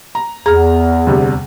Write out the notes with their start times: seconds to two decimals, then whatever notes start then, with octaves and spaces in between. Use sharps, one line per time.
0.15 A#5
0.46 E2 G#4 A#5 F6
1.07 D2 C3 G3